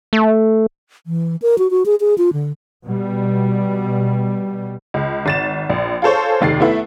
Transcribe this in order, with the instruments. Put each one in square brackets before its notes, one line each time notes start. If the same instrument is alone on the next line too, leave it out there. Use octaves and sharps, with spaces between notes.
[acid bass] A3
[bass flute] E3
A#4
F#4
F#4
G#4
G#4
F4
D3
[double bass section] B2 G3
[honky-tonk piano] C#2
G#1 A6 E7
A#1
F4 G#4 A4 C5 C#5
F1 D#2 A6 C7
A3 B3 E4 E5